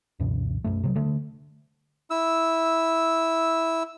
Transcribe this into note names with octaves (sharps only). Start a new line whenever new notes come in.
C#2 F#2 B2 E3
B1 F#2 A3
C3 F3 F#3
D3 A3
E4 E6